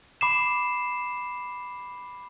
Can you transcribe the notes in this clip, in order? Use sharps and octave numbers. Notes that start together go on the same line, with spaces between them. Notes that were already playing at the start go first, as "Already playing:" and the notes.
B5 D6 C7 E7